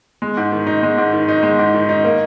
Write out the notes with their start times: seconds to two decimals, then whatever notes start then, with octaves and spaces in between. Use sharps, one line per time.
0.22 G#3
0.37 G#2
0.52 D#3
0.67 D#4
0.83 G#3
0.98 G#2
1.13 D#3
1.28 D#4
1.43 G#3
1.59 G#2
1.74 D#3
1.89 D#4
2.04 A#3